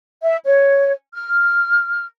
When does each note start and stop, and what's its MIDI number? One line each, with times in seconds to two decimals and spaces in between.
0.22 0.36 76
0.45 0.91 73
1.15 2.05 89